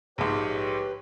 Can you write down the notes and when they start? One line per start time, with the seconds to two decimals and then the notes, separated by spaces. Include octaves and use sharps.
0.18 A#1 G#2 G4 B4 C#5